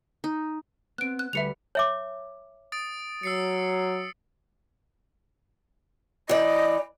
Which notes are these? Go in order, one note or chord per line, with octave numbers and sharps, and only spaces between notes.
D#4
B3 C4 F#6 D7
F#6
D2 G3 B4 E5 C#7 F7
C#5 E5 D6
D#6 A6 D7
F#3 E6 C7 C#7
E3 D5 D#5